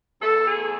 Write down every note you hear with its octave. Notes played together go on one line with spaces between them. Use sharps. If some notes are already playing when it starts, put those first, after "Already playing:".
E2 A4
G#4
A3